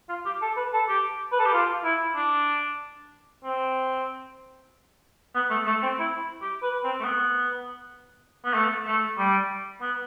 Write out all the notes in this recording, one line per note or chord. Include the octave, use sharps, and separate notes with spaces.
F4
G4
A4
B4
A4
G4
B4
A4
G4
F4
E4
D4
C4
B3
A3
A3
C4
E4
G4
B4
C4
A3
B3
B3
A3
A3
G3
B3